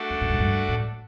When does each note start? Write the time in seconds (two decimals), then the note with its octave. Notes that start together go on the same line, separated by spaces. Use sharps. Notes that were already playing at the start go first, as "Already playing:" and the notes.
Already playing: A3 D4 F#4 A4 D5
0.10 F#2
0.21 A2
0.30 G#2
0.40 G2
0.69 A2